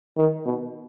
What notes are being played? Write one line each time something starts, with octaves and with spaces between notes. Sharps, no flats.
D#3
B2